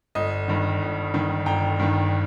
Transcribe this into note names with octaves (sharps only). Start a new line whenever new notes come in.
G1 D#5
G2 D#3
G1
G2 D#3
G1 G5 A#5
G2 D#3